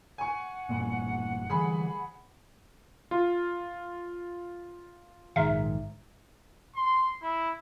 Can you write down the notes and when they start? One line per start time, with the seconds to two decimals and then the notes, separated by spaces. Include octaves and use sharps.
0.18 F#5 G#5 C#6
0.69 E1 G2 A#2
1.50 D3 E3 G3 G#4 B5
3.11 F4
5.36 A#1 G#2 D#3 D#4 G#4 E5 A#5
6.75 C6
7.22 E4